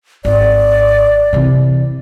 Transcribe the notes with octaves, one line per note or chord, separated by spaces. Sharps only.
G#1 D5
C3 E3